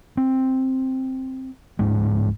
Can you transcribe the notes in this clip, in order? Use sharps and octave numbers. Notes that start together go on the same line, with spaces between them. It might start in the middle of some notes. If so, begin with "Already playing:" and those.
C4
D1 A#1 G#2 G#3